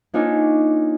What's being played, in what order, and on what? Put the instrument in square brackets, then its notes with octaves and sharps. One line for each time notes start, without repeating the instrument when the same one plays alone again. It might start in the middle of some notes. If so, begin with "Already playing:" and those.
[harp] A#3 D4 D#4 F4 C#5 G#5